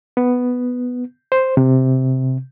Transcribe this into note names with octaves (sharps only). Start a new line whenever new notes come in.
B3
C5
C3